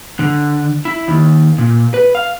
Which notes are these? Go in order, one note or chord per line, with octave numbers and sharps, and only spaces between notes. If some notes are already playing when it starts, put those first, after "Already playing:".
D3
E4
D#2
A#2
B4
F5